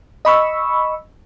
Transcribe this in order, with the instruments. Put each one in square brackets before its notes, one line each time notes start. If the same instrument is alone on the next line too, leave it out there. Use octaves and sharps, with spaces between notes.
[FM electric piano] D#5 B5 C#6 E6